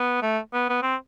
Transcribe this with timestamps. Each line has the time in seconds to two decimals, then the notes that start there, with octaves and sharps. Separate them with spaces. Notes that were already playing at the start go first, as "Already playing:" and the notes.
Already playing: B3
0.22 A3
0.53 B3
0.69 B3
0.82 C4